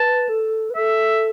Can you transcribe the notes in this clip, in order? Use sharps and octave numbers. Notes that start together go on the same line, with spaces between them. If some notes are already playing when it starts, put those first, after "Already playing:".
Already playing: B4 A5
A4
B4
A4 E5